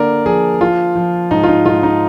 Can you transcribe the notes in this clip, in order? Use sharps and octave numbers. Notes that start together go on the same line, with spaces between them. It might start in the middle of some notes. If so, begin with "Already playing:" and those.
Already playing: D3 A#3 D4 A#4 D5
F3 G#4
F3 F4
F3
G#2 D#4
F4
D#4
G#2 F4
D#4